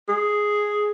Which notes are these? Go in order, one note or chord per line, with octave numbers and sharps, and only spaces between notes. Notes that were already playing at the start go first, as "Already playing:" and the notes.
G#4